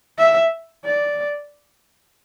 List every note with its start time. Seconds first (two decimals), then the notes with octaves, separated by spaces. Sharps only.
0.18 E5
0.84 D5